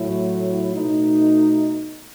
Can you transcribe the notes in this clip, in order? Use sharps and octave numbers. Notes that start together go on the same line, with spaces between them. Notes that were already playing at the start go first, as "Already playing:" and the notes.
Already playing: A2 F#3 A3 E4
B2 A3 D#4